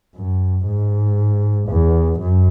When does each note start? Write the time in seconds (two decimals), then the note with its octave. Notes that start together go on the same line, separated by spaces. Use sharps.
0.16 F#2
0.67 G#2
1.69 E2
2.20 F#2